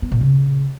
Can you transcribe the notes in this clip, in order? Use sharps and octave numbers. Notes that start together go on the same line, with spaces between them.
B3
A#2
C#3